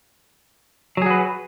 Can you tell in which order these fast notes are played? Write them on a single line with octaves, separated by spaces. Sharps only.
F#3 G#4 F#4 B4